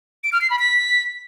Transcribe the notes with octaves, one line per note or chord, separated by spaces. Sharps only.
D7
F6
C7
B5
B6